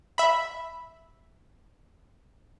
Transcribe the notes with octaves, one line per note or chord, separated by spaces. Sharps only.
E5 B5